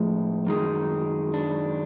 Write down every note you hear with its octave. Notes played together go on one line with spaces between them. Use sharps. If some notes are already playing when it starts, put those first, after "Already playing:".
Already playing: A2 F3 G#3
F#2 D#3 G#3
D4